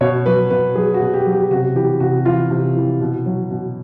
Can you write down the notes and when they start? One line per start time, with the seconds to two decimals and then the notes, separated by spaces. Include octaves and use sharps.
0.01 B2 C#5
0.26 F#3 B4
0.50 B2 B4
0.75 F#3 G#4
0.94 F#4
1.01 B2
1.13 G4
1.26 F#3
1.32 G4
1.51 C3 F#4
1.75 E3 G4
2.00 C3 F#4
2.25 E3 F4
2.50 C3
2.76 E3
3.01 B2
3.26 F#3
3.51 B2